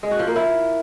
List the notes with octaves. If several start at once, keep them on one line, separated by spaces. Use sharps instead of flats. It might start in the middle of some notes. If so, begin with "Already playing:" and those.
G#3
F#4
F3
A#3
E4